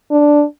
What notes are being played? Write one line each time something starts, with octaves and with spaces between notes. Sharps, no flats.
D4